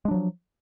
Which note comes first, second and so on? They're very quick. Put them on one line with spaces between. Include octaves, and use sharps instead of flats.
G#3 D4 F#3 F3